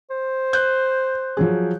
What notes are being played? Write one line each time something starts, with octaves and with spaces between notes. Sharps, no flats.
C5
F#6 G6
F3 F#3 G#4